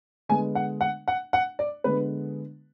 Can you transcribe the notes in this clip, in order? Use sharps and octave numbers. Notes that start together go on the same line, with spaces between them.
D3 G#3 B3 G#5
F#5
F#5
F#5
F#5
D5
D3 G#3 B3 B4